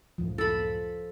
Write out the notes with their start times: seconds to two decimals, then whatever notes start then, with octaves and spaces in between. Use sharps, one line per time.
0.18 C#2 F#2 A2 F3
0.38 A4 B5